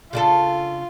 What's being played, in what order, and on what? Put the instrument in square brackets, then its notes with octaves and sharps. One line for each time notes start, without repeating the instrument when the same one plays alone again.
[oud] C#3 D4 A4 [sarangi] F4